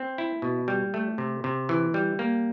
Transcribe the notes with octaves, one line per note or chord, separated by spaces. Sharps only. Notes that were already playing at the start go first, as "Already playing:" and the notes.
Already playing: C4
E4
B2
G3
A3
C3
C3
E3
G3
A#3